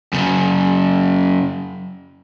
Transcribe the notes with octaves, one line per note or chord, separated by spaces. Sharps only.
F#2 C#3